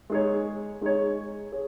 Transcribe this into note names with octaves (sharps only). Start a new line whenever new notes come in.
G#3 D#4 G#4 C#5
G#3 D#4 G#4 C#5
G#4 C#5